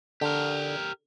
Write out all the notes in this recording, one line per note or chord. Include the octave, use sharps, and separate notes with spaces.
D3 G4 A#4